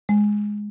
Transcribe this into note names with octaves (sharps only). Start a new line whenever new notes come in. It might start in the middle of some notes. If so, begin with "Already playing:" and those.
G#3